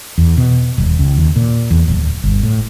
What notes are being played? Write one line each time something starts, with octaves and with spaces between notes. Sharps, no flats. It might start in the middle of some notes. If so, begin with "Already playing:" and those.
E2
B2
D#1
C#2
D#2
A#2
E2
D1
G1
A2